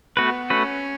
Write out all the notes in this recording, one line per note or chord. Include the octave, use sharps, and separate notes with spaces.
A3 B3 F#4 B4
A3 C#4 F#4 B4